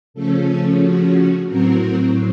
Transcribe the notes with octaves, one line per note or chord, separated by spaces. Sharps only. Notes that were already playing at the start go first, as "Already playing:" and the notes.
C#3 F3 A3 C#4 A4
F#4
A2 F#3 C4 F#4 A#4